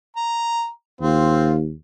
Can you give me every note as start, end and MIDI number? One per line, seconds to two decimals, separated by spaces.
0.16 0.69 82
1.01 1.72 39
1.01 1.56 60
1.01 1.56 65